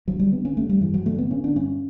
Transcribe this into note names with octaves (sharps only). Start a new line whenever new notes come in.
D3 F#3
G3
D3 B3
C#4
G2 A3
G3
G2 E3
F#3
D3 A3
B3
D3 C#4
D4
G2 C#4